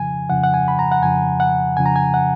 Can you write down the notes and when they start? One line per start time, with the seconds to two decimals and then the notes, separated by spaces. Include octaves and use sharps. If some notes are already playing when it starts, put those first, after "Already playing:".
Already playing: F2 C#3 F3 G#5
0.29 F2 C#3 F3 F#5
0.43 F#5
0.54 G#5
0.68 B5
0.79 A#5
0.92 F#5
1.02 F2 C#3 F3 G#5
1.40 F#5
1.77 F2 C#3 F3 G#5
1.86 A#5
1.96 G#5
2.14 F#5